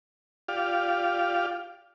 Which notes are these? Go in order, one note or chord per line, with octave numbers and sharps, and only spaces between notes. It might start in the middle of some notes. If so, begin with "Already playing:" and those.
F4 G4 D5 F5